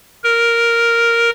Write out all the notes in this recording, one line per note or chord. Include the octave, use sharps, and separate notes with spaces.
A#4